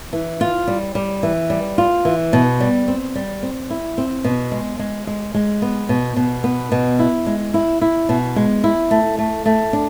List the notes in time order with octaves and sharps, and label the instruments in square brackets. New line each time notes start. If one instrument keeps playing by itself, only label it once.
[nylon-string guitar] E3
F4
G3
G3
E3
G3
F4
E3
B2
G3
C4
G3
C4
E4
C4
B2
G#3
G#3
G#3
G#3
B3
B2
B2
B3
B2
E4
G#3
E4
E4
B2
G#3
E4
A3
A3
A3
D4